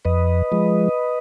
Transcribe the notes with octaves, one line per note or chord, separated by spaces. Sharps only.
F2 B4 D#5
F3 G#3